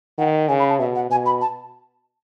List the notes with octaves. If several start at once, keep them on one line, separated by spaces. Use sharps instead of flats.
D#3 F#5
C#3 G#5
B5
A5
B2 E5
F#5
B2 G#5
B5
A5